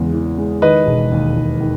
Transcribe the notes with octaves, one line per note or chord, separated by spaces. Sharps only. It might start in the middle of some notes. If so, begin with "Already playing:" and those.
Already playing: E2 C#3 G#3
E3
G#3
D#3 B4 D#5
E1
D#2
E1
D#3